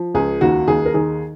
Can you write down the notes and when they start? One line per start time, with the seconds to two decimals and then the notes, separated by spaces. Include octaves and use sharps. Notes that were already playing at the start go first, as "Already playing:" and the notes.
Already playing: F3
0.15 C#2 G#4
0.41 D#2 F#4
0.68 D#2 G#4
0.86 A#4
0.94 D#3 G#4